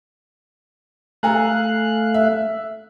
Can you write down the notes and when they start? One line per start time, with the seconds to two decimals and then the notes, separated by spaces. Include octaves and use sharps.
1.23 A3 A4 F5 G#5 A#5 F#6
2.14 E5